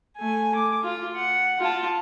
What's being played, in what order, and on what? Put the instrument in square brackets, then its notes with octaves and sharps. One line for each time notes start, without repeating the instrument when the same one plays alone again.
[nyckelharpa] A3 G#5
D6
F4
F#5
F4 A5